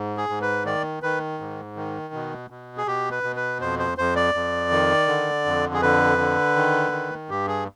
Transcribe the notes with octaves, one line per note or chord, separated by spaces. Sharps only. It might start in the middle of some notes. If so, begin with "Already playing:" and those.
Already playing: G#2
G#4
G#2
B4
D#3 D5
D#3 B4
G#2
D#3
B2
B2
G#4
B2 G4
B4
B2
B4
F2 C5
C5
F2 C5
D5
F2
D#3
D3
F2
G#4
D3 B4
D3
D#3
D#3
G2 G4
G#4